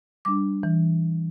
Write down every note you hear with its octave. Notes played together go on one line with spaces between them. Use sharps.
G3 D4 D6
E3